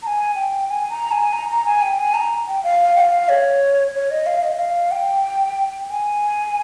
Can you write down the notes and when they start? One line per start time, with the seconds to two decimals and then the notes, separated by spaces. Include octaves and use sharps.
0.02 A#5
0.07 G#5
0.35 G5
0.69 G#5
0.90 A#5
1.11 G#5
1.33 A#5
1.49 A#5
1.65 G#5
1.82 G5
1.99 G#5
2.14 A#5
2.48 G5
2.63 F5
2.96 G5
3.00 F5
3.29 C#5
3.95 C#5
4.11 D#5
4.26 F5
4.43 D#5
4.59 F5
4.91 G5
5.90 G#5